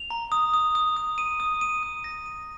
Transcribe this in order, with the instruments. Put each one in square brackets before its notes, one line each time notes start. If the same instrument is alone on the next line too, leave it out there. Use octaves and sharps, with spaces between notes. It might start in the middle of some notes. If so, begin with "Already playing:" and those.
Already playing: [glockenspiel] F7
A#5
D#6
D#6
D#6
D#6
D#7
D#6
D#7
D#6
A#6
D#7